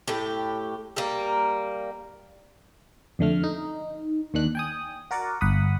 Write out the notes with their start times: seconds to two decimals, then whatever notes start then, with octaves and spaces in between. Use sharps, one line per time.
0.08 A2 G4
0.96 G3 A#3
3.19 F2 D3 A3 F6
3.44 D#4
4.34 D#2 D#3 D4 F#6
4.55 G5 G#5 D#6
5.11 F#4 A#4 D5 F#5 D6
5.41 G1 F#5 B5 D#6